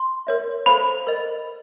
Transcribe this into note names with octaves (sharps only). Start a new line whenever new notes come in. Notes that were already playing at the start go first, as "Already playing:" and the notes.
Already playing: C6
A#4 C#5 E5
A4 C5 F5 B5
A#4 D#5